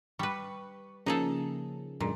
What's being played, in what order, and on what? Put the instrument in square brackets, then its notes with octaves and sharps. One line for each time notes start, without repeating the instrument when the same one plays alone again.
[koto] G3 B4 [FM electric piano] C#6
[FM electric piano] C#3 F3 A#3 [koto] D#4 G#4 A4
[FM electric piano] F#2 D3 G#3 [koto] A#2